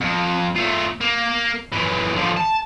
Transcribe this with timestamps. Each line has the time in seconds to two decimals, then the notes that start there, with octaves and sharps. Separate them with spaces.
0.01 F2
0.56 A3 F4
1.01 A#3
1.72 F#2 E3
2.16 D3 F3
2.37 A5